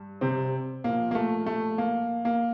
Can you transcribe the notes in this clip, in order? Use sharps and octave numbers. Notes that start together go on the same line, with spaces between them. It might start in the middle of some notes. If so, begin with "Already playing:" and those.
Already playing: G2
C3 C4
A#2 F3 A#3
A#3
A3
A3
A#3
A#3